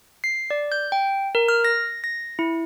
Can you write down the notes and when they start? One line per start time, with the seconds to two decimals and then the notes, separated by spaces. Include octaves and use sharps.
0.24 C7
0.50 D5
0.72 G6
0.92 G5
1.35 A#4
1.48 F6
1.65 A#6
2.04 A#6
2.39 E4